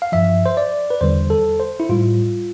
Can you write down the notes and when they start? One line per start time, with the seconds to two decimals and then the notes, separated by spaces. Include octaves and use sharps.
0.02 F5
0.12 G2 F3 E5
0.46 C5
0.57 D5
0.90 B4
1.01 E2 D3 G3 C5
1.30 A4
1.60 C5
1.80 E4
1.89 A2 G3 F4